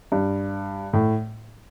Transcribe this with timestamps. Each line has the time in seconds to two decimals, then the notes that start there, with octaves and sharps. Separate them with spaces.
0.12 G2
0.93 A2